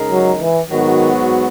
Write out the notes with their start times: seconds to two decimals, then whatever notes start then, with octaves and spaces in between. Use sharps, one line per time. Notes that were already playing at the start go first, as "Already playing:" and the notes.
Already playing: C#3 G#3 D#4 A#4
0.11 F#3
0.40 E3
0.70 G#2 D#3 F#3 B3 F#4